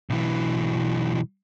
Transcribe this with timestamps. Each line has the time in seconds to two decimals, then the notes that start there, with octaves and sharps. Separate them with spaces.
0.10 B1 E3